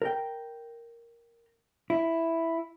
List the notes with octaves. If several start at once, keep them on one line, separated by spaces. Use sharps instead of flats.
A#4 G5
E4